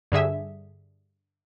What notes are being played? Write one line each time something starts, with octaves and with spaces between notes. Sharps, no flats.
G2 D3 G#4 E5